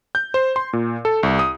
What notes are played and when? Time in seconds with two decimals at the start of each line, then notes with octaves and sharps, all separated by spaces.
0.15 G6
0.34 C5
0.56 C6
0.73 A#2
1.05 A4
1.23 C2
1.39 D#6